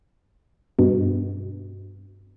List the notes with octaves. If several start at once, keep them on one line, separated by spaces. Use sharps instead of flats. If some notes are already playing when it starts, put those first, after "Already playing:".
G2 B2